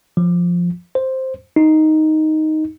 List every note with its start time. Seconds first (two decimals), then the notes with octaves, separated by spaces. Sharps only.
0.17 F3
0.95 C5
1.56 D#4